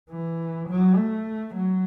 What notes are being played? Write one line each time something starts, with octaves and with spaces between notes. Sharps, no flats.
E3
F#3
A3
F#3